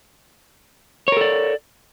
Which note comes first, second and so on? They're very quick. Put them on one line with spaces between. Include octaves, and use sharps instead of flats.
C#5 A#4 A4 D5